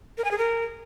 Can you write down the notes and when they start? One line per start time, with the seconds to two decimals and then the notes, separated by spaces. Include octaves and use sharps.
0.18 A#4
0.25 G#5
0.31 G#4
0.38 A#4